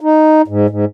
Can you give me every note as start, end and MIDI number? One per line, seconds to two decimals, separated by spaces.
0.01 0.42 63
0.48 0.67 44
0.70 0.85 44